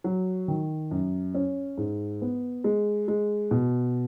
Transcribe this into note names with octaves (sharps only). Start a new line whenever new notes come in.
F#3
D#3
F#2
C#4
G#2
B3
G#3
G#3
B2